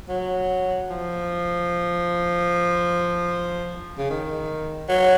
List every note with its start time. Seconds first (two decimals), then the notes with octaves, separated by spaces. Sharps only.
0.09 F#3
0.90 F3
3.98 C#3
4.10 D#3
4.89 F#3